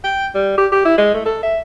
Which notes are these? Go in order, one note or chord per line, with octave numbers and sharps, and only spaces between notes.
G5
G3
G4
G4
E4
G#3
A3
A4
E5